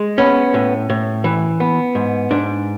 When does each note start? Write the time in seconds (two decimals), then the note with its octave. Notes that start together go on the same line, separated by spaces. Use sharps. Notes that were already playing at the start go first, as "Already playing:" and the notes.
Already playing: G#3
0.18 B3 C#4
0.54 A2
0.90 A2
1.24 E3
1.60 B3
1.95 G#2
2.31 G#2 D4